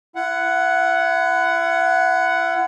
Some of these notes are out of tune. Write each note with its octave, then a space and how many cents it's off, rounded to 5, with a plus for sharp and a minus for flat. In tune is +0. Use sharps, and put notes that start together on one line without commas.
E4 +40 F#5 +0